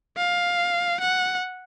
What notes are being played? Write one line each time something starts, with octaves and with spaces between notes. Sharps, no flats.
F5
F#5